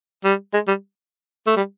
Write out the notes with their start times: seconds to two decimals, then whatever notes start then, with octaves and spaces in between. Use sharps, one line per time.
0.25 G3
0.54 G#3
0.68 G3
1.47 A3
1.57 G3